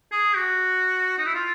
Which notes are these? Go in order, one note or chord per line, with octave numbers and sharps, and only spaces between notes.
G#4
F#4
D#4
E4
F4